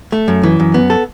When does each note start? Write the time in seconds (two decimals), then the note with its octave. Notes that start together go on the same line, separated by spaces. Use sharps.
0.12 A3
0.28 F#2
0.43 E3
0.60 F#2
0.74 B3
0.90 A4